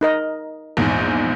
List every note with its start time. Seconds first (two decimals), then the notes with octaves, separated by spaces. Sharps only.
0.01 D#4 A#4 D#5
0.77 A#1 E2 G#2